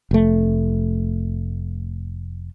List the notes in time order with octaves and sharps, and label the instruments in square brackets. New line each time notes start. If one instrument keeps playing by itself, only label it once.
[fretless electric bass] F1 A3